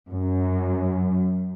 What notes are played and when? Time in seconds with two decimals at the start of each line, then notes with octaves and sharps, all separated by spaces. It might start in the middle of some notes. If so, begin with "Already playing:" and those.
0.11 F#2